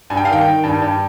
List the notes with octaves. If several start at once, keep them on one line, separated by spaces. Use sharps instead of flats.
G2 G#5
G5
F5
D#3 G5
D#3
G2
G2